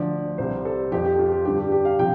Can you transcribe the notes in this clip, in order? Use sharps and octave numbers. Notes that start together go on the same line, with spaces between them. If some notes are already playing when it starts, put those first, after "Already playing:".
Already playing: D2 D3 F3 D5
C2 C3 G3 C5
A4
F2 F3 G4
G4
F4
G4
G2 D3 G3 G4
G4
G4
F5
C3 F3 G5